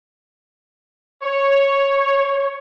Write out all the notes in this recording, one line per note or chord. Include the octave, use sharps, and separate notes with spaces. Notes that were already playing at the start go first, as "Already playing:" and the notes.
C#5